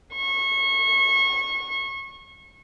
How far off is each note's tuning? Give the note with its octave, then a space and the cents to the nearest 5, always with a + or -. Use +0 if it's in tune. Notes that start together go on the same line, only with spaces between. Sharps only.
C#6 -25